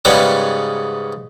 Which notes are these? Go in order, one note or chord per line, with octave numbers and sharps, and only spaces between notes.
G#2 C#3 G3 B3 C#4